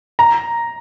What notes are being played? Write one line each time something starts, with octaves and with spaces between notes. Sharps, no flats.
A#5